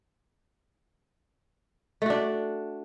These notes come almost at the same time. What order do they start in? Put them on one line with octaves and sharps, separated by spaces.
A3 F#4 D4